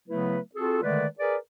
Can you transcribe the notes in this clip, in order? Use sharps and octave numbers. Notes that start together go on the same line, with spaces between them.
C#3 F#3 A3 B3 E4 B4
C4 F4 F#4 G#4 A4
D3 D#3 G#3 A3 B4 D5
G#4 A#4 B4 D5